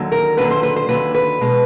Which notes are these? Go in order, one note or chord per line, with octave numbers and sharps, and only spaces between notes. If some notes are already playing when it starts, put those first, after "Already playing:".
Already playing: D#2 D3 F#3
A#4
D#2 D3 F#3 B4
C5
B4
C5
D#2 D3 F#3 B4
B4
B2 G#3